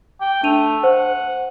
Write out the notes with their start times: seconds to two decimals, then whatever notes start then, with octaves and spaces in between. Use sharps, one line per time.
0.21 G5
0.43 A3 D4 D#7 F7
0.84 C5 F#5